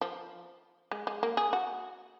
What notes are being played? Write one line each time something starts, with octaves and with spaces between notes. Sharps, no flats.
F3
G#3
G#3
A#3
G#4
F#4